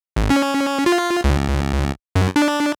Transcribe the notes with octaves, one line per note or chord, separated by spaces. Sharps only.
G#1
C#4
F4
C#2
F#2
D4